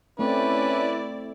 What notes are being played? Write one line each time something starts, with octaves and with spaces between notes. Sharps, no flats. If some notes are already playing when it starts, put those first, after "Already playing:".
A3 C4 C#4 E4 B4 D5